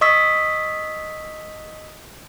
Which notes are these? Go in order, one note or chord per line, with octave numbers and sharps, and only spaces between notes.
D#5 C#6 D#6 E6 B6